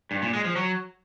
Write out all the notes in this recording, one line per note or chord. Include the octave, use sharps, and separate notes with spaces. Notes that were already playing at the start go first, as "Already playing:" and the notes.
G2
A#2
G#3
F3
F#3